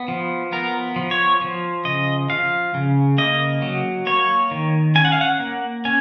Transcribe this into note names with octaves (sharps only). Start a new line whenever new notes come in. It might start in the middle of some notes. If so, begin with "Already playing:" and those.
Already playing: B3
F3
B3 A#4
F3
C#5
F3
C#3 D#5
F3 F5
C#3
A#3 D#5
F#3
A#3 C#5
D#3
C#4 G#5
F#5
F5
F#5
A#3
C#4 G#5